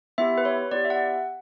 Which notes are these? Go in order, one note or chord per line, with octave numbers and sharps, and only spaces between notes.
B3 E4 G4 E5
B4
C#5
B3 E4 G4 D5
E5
F#5